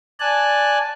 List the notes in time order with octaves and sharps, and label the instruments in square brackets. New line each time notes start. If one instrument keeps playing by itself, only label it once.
[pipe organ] D5 G#5 A5 F#6